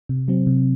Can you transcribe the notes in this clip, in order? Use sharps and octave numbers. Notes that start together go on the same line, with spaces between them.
C3
F#3 C4
C3